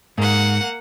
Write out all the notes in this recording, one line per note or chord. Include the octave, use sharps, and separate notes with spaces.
G#2 A#3 F#5